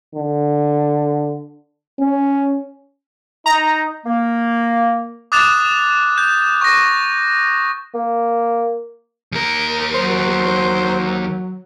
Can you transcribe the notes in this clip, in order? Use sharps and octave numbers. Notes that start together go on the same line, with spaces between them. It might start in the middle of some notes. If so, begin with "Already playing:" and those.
D3
C#4
D#4 A#5
A#3
D6 D#6 F#6 A6 E7 F7
G6
C#6 A#6
A#3
D#2 A#4
F#3 C5